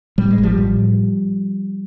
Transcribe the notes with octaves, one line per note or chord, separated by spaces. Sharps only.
A2 G3
G#3
A1
F3 G3
A2